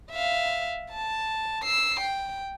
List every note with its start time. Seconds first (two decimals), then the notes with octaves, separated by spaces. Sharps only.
0.11 E5 F5
0.90 A5
1.63 E6 C7
2.00 G5